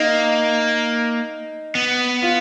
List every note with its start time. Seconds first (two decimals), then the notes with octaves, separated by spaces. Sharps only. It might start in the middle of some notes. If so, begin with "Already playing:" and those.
Already playing: A#3 D#4
1.75 B3
2.22 F4